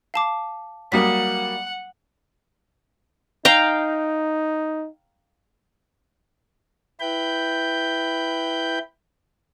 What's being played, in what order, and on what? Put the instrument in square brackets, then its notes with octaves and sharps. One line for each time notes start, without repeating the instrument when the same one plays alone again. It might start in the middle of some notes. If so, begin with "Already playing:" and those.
[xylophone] F5 A5 D6
[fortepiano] F#3 G3 A#3 [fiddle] F#5 [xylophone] D#6 B6
[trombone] D#4 [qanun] F5 G5 A#5
[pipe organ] E4 B4 G5 B5 G6